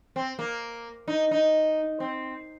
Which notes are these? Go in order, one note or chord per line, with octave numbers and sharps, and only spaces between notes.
C4
A#3
D#4
D#4
C4